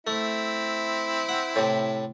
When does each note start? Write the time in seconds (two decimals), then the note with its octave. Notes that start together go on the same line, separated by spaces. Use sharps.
0.07 A3 C4 E4
1.29 F#5
1.56 A2 C3